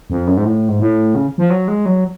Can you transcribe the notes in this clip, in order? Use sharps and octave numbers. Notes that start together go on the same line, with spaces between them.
F2
F#2
G#2
A2
G#2
A2
C#3
F3
F#3
G#3
F#3